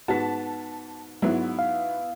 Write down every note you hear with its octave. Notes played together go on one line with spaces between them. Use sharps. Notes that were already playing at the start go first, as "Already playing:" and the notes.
G#2 B3 F#4 A5 B6
G#2 F#3 B3 E4
F5